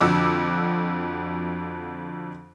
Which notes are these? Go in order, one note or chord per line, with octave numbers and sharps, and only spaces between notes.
F2 D3 F#4 D6 E6